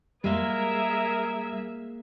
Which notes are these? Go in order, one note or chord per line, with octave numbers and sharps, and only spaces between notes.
G3 G#3 A#3 G#4 A#4 E5